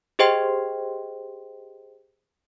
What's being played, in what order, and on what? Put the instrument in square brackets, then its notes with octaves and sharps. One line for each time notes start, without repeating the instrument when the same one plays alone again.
[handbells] G4 G#4 C5 D#5 G5 C6